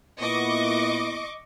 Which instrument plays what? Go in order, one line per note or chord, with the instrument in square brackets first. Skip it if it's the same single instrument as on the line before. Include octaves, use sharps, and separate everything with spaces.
[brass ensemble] A#2 B3 E4 [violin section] D#5 C#6 D6